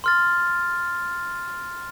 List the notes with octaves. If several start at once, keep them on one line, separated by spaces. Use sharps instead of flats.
C6 F6 A6